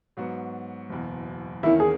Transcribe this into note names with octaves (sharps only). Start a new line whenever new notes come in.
G#2 F#3 B3 F#4
F#1 E2 B2
E2 D#3 A#3 C#4 E4
G#4